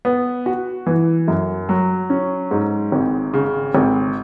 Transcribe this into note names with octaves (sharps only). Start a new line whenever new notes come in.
B3
F#4
E3
F#2
F#3
C#4
G#2
G#1
C#3
G#1